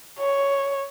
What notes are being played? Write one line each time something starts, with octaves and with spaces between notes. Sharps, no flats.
C#5